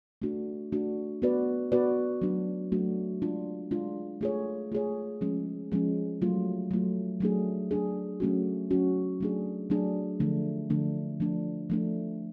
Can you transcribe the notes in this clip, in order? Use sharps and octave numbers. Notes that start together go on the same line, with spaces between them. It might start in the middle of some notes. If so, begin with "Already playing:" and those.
A3 D4 F#4
A3 D4 F#4
B3 F#4 B4 D5
B3 F#4 B4 D5
F#3 A3 D4 F#4
F#3 A3 D4 F#4
G#3 D4 F4
G#3 D4 F4
A3 F4 G#4 C#5
A3 F4 G#4 C#5
F3 G#3 C#4
F3 G#3 C#4
F#3 A3 F4
F#3 A3 F4
F#3 A3 D4 G#4
F#3 A3 D4 G#4
F#3 A3 C#4 F#4
F#3 A3 C#4 F#4
F#3 A3 D4 G#4
F#3 A3 D4 G#4
D3 F3 A3 D4
D3 F3 A3 D4
F3 A3 D4
F3 A3 D4